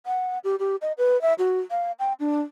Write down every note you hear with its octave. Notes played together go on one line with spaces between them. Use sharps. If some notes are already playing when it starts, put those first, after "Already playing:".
F#5
G4
G4
D#5
B4
E5
F#4
F5
G5
D4